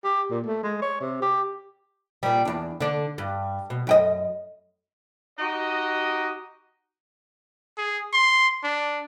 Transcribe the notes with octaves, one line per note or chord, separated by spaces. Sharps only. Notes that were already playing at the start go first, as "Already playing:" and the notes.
G4
A#2
A3
G#3
C#5
C3
G4
A#2 G3
E2 D4
D3 D4
G2
B2
F#2 G4 D#5
D#4 F#4 G4 D#5
G#4
C6
D4